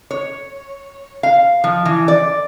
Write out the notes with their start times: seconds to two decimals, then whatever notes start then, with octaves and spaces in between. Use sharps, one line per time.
0.11 C#5
1.23 F5
1.64 F3
1.85 E3
2.08 D5